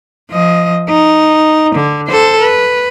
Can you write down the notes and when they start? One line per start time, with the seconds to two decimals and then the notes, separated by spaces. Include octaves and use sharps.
0.31 F3 D#5
0.89 D#4
1.75 D3
2.07 A4 C5
2.40 B4